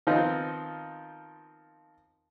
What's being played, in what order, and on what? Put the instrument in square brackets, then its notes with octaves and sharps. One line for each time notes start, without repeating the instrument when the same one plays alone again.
[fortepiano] D#3 F3 B3 C4 D#4